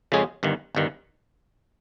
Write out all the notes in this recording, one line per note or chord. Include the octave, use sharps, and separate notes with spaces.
F2 C#3 G#3 C#4 G#4
G1 G2 D#3
G1 G2 D#3